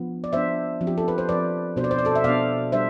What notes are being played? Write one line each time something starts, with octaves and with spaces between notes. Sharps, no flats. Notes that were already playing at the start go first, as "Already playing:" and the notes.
Already playing: F3 B3 D4
D5
F3 B3 D4 C5 E5
F3 C4
G4
A4
B4
C5
F3 C4 B4 D5
B2 B3 D4 C5
D5
C5
D5
A4 C5
E5
B2 B3 D4 D5 F5
G3 D4 C5 E5